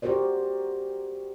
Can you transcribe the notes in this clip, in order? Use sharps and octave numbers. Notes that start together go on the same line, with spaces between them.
F#4 G4 A#4 C5 D5